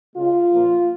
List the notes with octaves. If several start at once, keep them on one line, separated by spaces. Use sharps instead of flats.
C#3 G#3 F4
A#2 F3 A#3